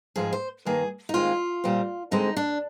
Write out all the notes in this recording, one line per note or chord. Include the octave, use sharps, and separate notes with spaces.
G#2 F3 G#3 C4 G#4
C5
G2 D#3 A#3 G#4
D#4
D#2 D#3 G#3 C4 F4
A#2 G3 C4
D2 D3 G#3 C4 D#4
D4